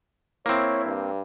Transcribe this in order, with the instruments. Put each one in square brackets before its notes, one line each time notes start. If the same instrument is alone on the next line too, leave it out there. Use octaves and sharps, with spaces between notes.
[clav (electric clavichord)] A#3 C4 [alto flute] E4 [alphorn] C#5
[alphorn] G2